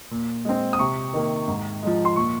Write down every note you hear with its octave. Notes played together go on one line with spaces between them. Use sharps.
A#2
G#3 C4
D#6
C3 C#6
D#3 A#3
G#2
F3 G#3
C6
A#2 C#6